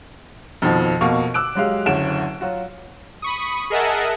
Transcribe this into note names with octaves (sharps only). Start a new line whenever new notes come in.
F2 B2 D#3 F3
F2 B2 A#3 F5 C#6
D6 E6 F#6 D7
F#3 G#3 G4 F5
F#1 D2 C#4 D7 E7
F#3 F4 F#4
B5 C#6 D#6
G#4 A#4 D#5 E5 F#5 A5